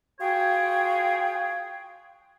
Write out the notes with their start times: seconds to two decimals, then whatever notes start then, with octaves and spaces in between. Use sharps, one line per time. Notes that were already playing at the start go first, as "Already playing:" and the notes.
0.20 F4 F#4 G#4 C#5 G5